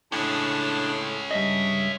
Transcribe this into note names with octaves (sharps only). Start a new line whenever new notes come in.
A2 G#3 C#4 D4
G2 D#5 E5